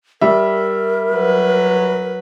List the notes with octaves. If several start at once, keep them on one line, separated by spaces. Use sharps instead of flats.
G3 A#4 E5
F#3 B4